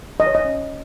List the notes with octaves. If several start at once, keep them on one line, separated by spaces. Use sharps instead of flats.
B4 D#5
C#5
D#5
C#4